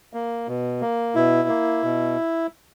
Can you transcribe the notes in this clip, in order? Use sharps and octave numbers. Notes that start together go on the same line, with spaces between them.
A#3
B2
A#3
B2 E4
A#3
B2